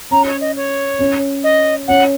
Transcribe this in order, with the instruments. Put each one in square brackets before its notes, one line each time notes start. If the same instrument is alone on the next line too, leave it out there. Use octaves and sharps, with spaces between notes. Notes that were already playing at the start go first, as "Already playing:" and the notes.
[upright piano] C#4 [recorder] A#5
[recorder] C#5
D#5
C#5
[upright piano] C#4
[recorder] D#5
[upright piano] C#4 [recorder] F#5